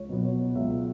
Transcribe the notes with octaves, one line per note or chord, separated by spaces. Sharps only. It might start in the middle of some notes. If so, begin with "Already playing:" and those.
Already playing: C#2 C#5
B2 F#3 B3
C#5
C#2 E5